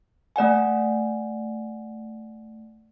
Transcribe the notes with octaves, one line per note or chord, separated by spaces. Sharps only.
A3 D5 F#5 G#5